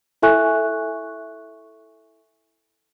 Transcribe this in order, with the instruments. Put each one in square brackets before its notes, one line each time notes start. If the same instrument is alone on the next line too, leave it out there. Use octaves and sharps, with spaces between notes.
[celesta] E4 A4 E5 G#5 C#6 F#6